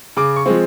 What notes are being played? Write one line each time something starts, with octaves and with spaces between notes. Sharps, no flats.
C#3 D6
C#6
F3 G#3 C4